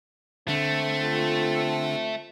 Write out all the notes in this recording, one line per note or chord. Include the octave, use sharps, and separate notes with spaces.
D3 A3 C4
F4 A4